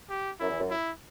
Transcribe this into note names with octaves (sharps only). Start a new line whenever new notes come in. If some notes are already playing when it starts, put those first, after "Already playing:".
G4
F#2 E4
E2
F#2
E4